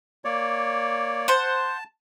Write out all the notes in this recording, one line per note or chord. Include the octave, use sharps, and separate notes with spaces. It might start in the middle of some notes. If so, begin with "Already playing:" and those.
A#3 C#5 D5
C5 F#5 A5